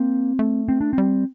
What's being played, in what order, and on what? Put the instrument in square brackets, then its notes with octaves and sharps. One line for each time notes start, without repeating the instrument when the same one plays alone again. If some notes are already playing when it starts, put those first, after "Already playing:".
Already playing: [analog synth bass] A#3 [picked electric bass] C4
[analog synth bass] A3
[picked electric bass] C4
D4
[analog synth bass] G3 [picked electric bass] C4